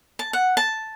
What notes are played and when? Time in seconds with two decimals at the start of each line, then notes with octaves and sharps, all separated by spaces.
0.19 A5
0.33 F#5
0.57 A5